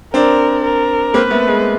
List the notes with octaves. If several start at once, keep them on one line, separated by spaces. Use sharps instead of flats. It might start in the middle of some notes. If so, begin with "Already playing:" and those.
C4 D4 A#4
A#4
A#3 C4 B4
A3 B3
G#3